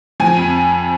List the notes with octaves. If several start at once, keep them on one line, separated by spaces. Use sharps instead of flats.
F3 G#5
F2